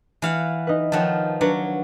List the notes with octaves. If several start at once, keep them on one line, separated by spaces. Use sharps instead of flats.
E3 F5 F#5
D#4 B4
D#3 F3 C#5 F#5 A5
F#3 D4 B4 C#5